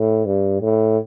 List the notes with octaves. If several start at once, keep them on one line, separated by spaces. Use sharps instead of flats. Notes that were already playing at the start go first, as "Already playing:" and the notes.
Already playing: A2
G2
A2